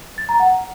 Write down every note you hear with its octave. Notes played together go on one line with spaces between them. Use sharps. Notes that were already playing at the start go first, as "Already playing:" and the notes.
A6
A#5
F#5